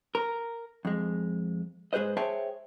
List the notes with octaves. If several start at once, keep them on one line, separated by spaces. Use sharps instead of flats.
A#4
F2 G#3
G#2 G#4 B4 C5 D#5
G#4 C5 C#5 E5 G5 A5